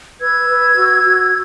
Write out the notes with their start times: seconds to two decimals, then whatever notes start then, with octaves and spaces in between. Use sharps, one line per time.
0.20 B4 E6 G#6
0.49 B4
0.76 F#4
1.04 F#4